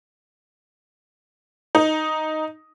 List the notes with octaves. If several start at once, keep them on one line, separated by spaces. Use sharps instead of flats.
D#4